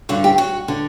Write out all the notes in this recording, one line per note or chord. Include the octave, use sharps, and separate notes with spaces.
G2 D3 F#4
G4
F#4
D3